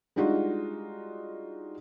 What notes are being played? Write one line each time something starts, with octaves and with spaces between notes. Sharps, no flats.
G3 G#3 D4 D#4 F4 F#4